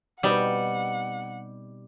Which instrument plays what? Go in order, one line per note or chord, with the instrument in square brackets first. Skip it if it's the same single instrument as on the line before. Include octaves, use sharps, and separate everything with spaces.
[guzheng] B2 C4 D#4 [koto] G3 [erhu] F#5